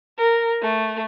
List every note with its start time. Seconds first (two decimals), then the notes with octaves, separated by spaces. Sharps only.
0.18 A#4
0.62 A3